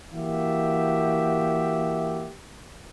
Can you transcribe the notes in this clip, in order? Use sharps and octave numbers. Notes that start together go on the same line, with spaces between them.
E3 A#3 F#4 G4 E5